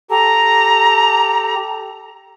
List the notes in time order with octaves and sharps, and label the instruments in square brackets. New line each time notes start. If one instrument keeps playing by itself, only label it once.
[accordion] G4 A4 [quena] A#5